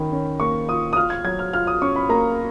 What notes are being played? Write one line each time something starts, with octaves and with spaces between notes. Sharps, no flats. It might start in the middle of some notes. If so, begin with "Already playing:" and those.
Already playing: D#3 C#4 B5
C#4
A#3 C#6
F4 D#6
D#6
F4 F6
G#6
F#3 G#6
F6
F4 F6
D#6
C#4 C#6
B5
A#3 A#5